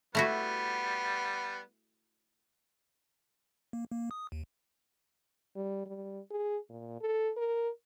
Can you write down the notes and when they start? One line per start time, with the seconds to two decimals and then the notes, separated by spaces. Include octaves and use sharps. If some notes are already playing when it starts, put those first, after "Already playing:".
0.15 G3 A3 B3 E4 F#4
3.73 A#3
3.92 A#3
4.11 D#6
4.32 D#2
5.56 G3
5.86 G3
6.31 G#4
6.70 A#2
7.01 A4
7.37 A#4